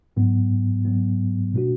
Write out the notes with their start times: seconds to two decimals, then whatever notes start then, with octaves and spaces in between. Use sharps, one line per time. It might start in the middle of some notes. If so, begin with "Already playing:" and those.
0.17 G#2 F#3 B3
0.85 G#2 F#3 B3
1.53 B2 A3 D4 F#4